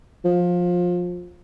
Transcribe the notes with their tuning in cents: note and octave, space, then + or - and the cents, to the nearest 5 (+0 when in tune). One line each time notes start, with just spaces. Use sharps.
F3 +20